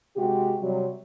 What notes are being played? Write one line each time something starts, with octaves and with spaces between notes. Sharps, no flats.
C3 G#3 F#4 G4
C3 F#3 G3